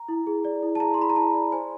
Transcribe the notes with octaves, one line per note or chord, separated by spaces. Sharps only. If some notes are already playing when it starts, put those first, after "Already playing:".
Already playing: A#5
E4
G#4
D5
E4
A5
G#4 A#5
C6
E4 B5
A#5
E4 A5
D5
C5 G#5